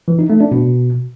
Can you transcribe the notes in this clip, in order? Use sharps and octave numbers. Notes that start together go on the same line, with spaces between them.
E3
D#4
A3
D4
B2